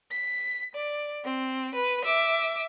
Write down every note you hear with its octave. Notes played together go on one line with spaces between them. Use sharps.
B6
D5
C4
B4
E5 D6